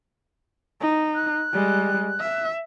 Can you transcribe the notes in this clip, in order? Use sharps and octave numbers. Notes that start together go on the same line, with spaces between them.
D#4
F#6
G3 G#3
E5